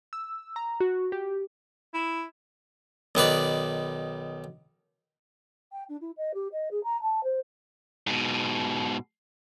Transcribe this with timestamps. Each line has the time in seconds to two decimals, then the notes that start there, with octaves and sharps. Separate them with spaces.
0.13 E6
0.56 A#5
0.80 F#4
1.12 G4
1.94 E4
3.15 B1 D#3 B4 D5
5.71 G5
5.88 D4
6.00 E4
6.17 D#5
6.34 G4
6.52 D#5
6.70 G#4
6.83 A#5
7.01 A5
7.23 C5
8.07 G#2 B2